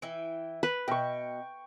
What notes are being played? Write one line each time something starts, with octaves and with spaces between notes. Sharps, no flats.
E3 E4 G5
B4
B2 G5 C#6